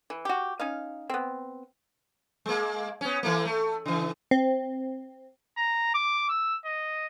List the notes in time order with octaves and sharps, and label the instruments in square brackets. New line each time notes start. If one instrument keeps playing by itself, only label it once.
[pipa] E3
F#4 G4
C#4 D#4 F5
B3 C4
[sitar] G#3 A#3
B3 C#4
E3 A3 A#3
A3
C#3 E3
[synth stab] C4
[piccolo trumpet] A#5
D6
E6
D#5